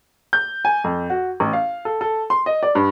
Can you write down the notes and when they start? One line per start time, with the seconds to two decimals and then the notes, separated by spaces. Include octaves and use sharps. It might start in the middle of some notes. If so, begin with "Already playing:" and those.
0.33 G6
0.65 G#5
0.84 F2
1.10 F#4
1.40 A1
1.53 F5
1.85 A4
2.01 A4
2.30 C6
2.46 D#5
2.63 D5
2.75 G2